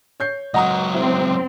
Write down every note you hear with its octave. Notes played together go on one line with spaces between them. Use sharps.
C#5 G6 C7
C#2 F#3 D#5 F#5 A#5 D#6
C4 E4